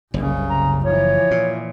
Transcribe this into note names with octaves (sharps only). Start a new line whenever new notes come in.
F#1 C2 C#3
A#5
E3 F3 C#5
A#2